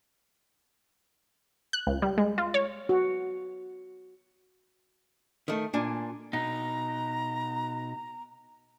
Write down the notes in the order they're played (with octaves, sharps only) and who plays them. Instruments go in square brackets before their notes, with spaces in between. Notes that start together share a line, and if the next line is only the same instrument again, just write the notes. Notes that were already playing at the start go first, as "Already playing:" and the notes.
[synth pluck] F#6
C#2
G3
G#3
F4
C#5
[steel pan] F#4
[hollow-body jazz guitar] D#3 A3
A#2 D4 G#5
[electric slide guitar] B2 D#4 [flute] A#5